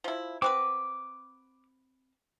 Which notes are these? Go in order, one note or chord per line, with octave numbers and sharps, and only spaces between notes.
F3 E4
C4 F#4 B4 D6